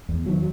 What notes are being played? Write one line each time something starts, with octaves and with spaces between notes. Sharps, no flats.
E2
D#3 F#3